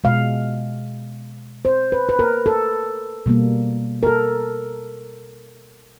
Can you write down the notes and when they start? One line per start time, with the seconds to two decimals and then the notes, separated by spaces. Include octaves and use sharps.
0.04 B2 G#3 F5
1.65 C5
1.92 B4
2.09 B4
2.19 A#4
2.46 A4
3.26 B2 G3 A#3
4.03 A#4
4.07 A4